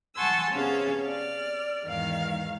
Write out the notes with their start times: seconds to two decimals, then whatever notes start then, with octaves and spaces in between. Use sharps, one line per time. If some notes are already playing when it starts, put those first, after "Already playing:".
0.15 F#5 G#5 A5 C6 C#6 E6
0.50 C3 B3 C#4 G#4 F5
1.03 D5 F6
1.84 E2 G#2 D#3 F5